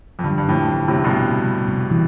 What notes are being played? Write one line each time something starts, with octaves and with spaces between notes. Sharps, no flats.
F2
G2 D3
G2
F2 A2 E4
F2 D3
A2 C3
A3
G2 B2
C3
G3
C3
E3